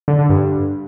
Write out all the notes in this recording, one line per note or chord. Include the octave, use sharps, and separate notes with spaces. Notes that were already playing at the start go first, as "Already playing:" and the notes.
D3
D3
G2